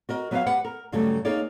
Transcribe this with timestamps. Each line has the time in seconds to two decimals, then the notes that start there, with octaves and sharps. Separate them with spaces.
0.09 F#4 A#4 D#5
0.31 F#3 B3 F#4 B4 E5 F5
0.46 G4 B4 F#5
0.65 A#4
0.92 G2 C#3 F#3 G3 A3
1.25 A#3 D#4 G#4 C#5 D5